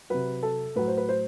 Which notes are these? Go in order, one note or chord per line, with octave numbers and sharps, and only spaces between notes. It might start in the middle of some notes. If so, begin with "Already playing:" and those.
C3 F#3 B4
A4
A2 F#3 B4
C5
B4
C5